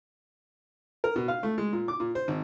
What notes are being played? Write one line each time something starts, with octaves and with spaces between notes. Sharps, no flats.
A#4
B2
F5
A3
G#3
A#2
D6
A#2
C5
G#1